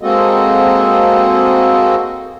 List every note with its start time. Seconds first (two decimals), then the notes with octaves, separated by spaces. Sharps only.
0.01 G#3 A#3 C4 F#4 A4 D#5